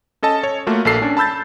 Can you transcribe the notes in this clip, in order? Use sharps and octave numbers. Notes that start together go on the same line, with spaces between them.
C#4 A4 D#5 A5
C#5
A3 A#3 F4 F#4
A#1 A#3 A4 C7
C#4 D4
A5 B5 E6 G6 A6